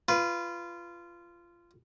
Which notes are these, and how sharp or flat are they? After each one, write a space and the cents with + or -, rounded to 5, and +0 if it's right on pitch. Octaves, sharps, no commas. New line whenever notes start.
F4 -20 B4 +0